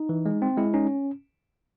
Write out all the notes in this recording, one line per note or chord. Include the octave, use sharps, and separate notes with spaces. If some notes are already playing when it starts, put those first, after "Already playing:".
Already playing: D#4
E3
G#3
C4
G#3 E4
C#4 D#4